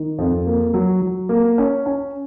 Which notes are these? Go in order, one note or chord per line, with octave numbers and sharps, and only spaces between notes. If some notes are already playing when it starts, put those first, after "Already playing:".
Already playing: D#3
F2
A#3
F#3
F#3
A#3
C#4
C#4